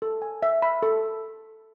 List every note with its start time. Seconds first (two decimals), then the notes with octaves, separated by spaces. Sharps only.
0.02 A4
0.22 G#5
0.43 E5
0.62 B5
0.83 A4